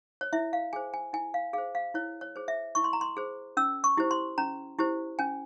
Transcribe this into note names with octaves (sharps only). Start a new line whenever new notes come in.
C#5
E4 E5
F5
G#4 C5 G#5
G#5
E4 G#5
F5
G#4 C5 F5
F5
E4 C#5
C#5
G#4 C5
E5
E4 C#6
C6
A#5
C6
G#4 C5
C#4 E6
C#6
E4 G4 C5
C6
C#4 A#5
E4 G4 C5
C#4 G#5